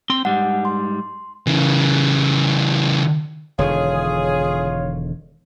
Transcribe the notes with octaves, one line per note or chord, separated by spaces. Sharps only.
C4 C6
G#2 G3 F#5
C6
C#3 E3
E1 D3 D#3 F4 G#4 C#5